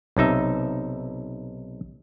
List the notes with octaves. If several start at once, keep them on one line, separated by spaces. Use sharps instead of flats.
B1 C3 D#4 E5